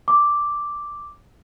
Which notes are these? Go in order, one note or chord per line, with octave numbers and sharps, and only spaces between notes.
D6